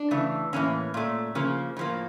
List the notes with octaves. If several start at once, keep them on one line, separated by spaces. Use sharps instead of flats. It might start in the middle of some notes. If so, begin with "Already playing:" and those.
Already playing: D4
C#3 E3 A3
A2 E3 A#3 C#4
A#2 A3
C#3 F3 A#3
A2 F3 A#3